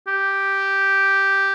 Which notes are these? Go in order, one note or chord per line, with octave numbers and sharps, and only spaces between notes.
G4